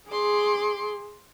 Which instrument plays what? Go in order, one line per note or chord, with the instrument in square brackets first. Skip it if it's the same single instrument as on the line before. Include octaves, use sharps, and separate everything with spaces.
[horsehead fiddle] G#4 [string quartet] C6 D6